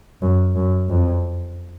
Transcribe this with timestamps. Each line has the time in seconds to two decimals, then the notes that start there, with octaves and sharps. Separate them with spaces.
0.22 F#2
0.56 F#2
0.89 F2